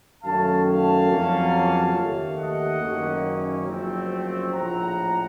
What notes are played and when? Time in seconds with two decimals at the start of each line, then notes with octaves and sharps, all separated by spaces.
0.23 F#2 D#3 A3 C#4 F5 A5
0.66 F5 A5
1.10 F2 C#3 F#3 A#3 C#4
1.95 D#2 D#3 A3
2.38 D#5 F#5
2.81 F#1 F#2 D#3 A#3 C#4
3.67 F#1 F#2 F3 A3 C4
4.53 A#1 A2 F3 F#5 A#5